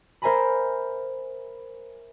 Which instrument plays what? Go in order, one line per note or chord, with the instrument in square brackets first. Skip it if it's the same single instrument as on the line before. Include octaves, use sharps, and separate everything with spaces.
[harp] A#4 C5 E5 G#5 A#5 B5